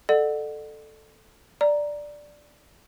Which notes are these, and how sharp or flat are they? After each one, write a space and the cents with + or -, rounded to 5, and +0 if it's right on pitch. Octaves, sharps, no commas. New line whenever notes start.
A4 +0 D5 +40 F#5 +0
D5 +0 A#5 +0